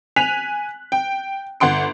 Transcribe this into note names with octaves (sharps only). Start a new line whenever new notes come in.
G#5 F#6 B6 F7
G5
G1 F#5 C6 D7